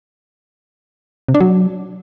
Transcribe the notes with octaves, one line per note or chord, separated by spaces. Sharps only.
C3
D4
F#3